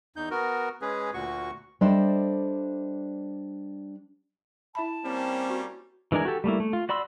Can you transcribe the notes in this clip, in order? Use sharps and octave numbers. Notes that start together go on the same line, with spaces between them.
E2 D#4 G6
B3 F#4 A#4
G#3 C#4 G#4 B4
D2 A#2 F#4 C#6
G3 D4 A4 C5 D#5 E5
E4 E5 A5 B5
G3 A#3 C4 C#4
F#4
E3 G#3 D4 A#4 G#5
F#4 G4 A4
G3 A3 A#3 E4
A3
F4
F#4 D5 B5 C6 E6